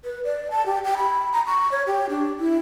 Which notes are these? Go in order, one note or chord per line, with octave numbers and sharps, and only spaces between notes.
B4
D5
A5
G4
G5
B5
A#5
C#6
C#5
G4
D4
E4